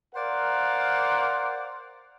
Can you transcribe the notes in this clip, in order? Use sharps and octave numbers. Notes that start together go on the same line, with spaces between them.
A#4 C5 D5 F5 F#5